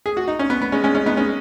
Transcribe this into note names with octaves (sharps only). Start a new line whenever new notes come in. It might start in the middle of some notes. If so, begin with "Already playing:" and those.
G#4
F#4
D#4
C#4
B3
B3
G#3 C#4
G#3 C#4
G#3 C#4
B3 D#4
G#3 C#4